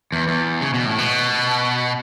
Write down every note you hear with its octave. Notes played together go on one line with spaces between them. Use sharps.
E2
E2
C#3
B2
A2
B2